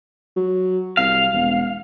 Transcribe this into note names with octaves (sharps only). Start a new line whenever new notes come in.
F#3
C2 F5
E1